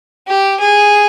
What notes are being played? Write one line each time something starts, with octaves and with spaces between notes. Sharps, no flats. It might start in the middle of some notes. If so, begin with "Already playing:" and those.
G4
G#4